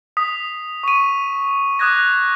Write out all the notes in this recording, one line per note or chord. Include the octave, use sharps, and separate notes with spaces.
D#6 B6
C#6 D#7
D6 D#6 F#6 G#6 A#6